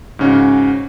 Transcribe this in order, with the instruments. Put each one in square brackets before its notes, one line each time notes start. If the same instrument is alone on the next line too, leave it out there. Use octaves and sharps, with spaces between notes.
[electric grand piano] G#2 C#3 C#4 F#4